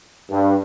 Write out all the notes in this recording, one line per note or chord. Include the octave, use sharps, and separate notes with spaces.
G2